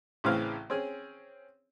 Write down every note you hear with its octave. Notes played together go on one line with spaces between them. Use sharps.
A1 A2 C#3 E3 C4 F5
C4 C#4 G#4